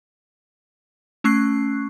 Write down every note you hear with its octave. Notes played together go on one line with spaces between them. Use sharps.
A3 C#4 C#6 F#6 C7